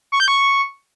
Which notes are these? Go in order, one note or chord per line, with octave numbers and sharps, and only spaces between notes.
C#6
G6
C#6